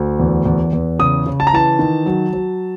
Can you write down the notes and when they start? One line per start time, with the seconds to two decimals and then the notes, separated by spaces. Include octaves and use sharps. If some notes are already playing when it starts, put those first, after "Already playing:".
Already playing: D2
0.20 E2
0.46 E2
0.73 E2
0.99 C#3 D#6
1.26 C#3
1.40 A5
1.47 A#5
1.53 E3 A5
1.79 D#3
2.06 F#3
2.33 F#3